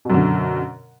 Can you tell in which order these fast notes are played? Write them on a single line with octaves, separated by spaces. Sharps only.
B2 F#2 D3